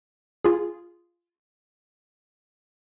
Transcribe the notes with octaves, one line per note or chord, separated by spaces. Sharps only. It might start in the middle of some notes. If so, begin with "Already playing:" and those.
F4 G#4